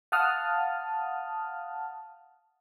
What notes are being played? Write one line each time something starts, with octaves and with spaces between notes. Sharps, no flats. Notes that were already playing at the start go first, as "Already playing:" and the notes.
F5 F#5 A5 D#6 F6